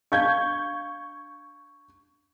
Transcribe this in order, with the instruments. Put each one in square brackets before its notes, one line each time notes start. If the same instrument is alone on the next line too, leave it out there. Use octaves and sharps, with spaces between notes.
[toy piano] D4 D#5 F5 [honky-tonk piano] C#6 G6 G#6